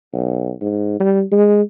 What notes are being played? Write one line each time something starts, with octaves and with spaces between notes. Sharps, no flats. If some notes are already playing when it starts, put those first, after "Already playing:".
B1
G#2
G3
G#3